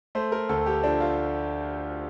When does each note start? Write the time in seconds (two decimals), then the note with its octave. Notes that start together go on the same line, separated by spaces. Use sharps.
0.15 A3 C5
0.32 A#4
0.49 D2 A4
0.66 G4
0.83 F3 D4
1.00 F4